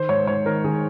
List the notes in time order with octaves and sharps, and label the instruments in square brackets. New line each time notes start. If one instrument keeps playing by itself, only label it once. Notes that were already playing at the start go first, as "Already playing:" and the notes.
Already playing: [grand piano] D#3 C5
G#2 C#5
G#2 C#5
D#3 A#4
D#3 G#4